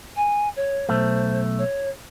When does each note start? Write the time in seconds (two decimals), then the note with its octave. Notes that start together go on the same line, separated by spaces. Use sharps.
0.16 G#5
0.56 C#5
0.89 B1 A3 C5
1.58 C#5